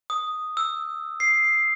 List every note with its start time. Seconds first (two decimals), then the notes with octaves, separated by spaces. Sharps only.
0.10 D#6
0.57 E6
1.20 C7